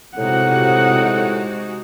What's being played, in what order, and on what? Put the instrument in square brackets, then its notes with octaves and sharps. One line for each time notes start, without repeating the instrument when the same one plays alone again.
[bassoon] A2 [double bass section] C3 [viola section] G#3 D#4 F#4 [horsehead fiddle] F#5